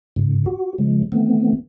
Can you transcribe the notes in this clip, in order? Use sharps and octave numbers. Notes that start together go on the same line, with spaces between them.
G#2 C#3
F#4
C#3 F3 G#3
D#3 E3 A3 B3 C4